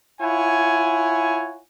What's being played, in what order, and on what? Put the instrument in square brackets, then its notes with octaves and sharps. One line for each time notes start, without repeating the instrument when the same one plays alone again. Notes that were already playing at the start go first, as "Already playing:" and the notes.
[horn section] E4 F4 C#5 F#5 G#5